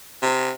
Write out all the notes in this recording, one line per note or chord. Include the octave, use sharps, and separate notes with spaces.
C3